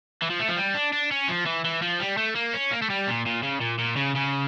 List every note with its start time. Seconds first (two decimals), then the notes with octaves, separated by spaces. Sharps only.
0.22 E3
0.30 F3
0.39 A3
0.48 F3
0.57 G3
0.75 D4
0.93 D4
1.11 C#4
1.28 F3
1.46 E3
1.65 E3
1.82 F3
2.00 G3
2.17 A3
2.35 A#3
2.54 C#4
2.72 A#3
2.82 A3
2.90 G3
3.07 A#2
3.26 A#2
3.43 C#3
3.60 A#2
3.79 A#2
3.96 C#3
4.15 C#3